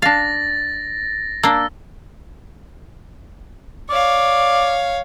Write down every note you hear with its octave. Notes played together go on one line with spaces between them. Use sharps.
D4 F5 A6 A#6
A#3 D4 E6
C#5 D5 F5